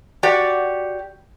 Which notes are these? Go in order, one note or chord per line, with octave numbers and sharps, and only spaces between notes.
F#4 G4 D5